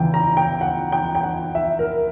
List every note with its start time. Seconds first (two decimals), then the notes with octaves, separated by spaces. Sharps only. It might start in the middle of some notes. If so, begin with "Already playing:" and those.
Already playing: E2 C#3 E3 G5
0.14 A#5
0.37 G5
0.61 F#5
0.92 G5
1.15 G5
1.24 F#5
1.55 E5
1.79 A#4